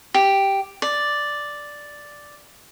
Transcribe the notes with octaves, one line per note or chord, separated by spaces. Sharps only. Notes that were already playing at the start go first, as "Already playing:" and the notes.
G4
D5